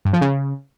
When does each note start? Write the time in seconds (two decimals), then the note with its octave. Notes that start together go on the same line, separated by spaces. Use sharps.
0.05 G2
0.13 F3
0.21 C#3